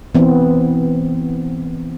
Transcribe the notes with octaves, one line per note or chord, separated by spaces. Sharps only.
E3 B3 C4